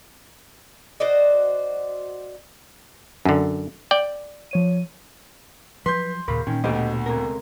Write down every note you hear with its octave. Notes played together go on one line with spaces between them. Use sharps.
F#4 C5 D5 D#5
F#2 D3
D5 G5
F3 C#5 D#7
F3 F#3 B4 C6 G6
D#2 A#2 C#3 A#4 B5
A#2 D#3 C#4
D2 B2 G4 C5 D#5
C#2 C3 A#4